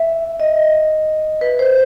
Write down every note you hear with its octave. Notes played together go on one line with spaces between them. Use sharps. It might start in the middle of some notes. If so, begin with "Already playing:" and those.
Already playing: E5
D#5
B4
C5